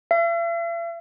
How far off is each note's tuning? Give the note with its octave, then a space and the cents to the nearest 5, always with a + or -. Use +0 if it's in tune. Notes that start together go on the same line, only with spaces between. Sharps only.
E5 +45